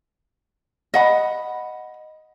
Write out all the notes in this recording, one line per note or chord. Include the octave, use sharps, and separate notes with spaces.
D#5 F#5 B5